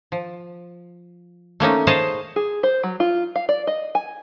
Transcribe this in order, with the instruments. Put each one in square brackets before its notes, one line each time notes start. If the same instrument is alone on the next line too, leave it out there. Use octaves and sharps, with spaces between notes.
[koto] F3
A3 A#3 C#4 D#4
G#4 C5 C#5 D#5 F5 A5
[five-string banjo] G#4
C5
F#3
F4
F5
D5
D#5
G#5